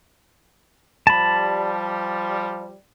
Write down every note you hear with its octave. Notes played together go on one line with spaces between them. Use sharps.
F3 G3 A5 B5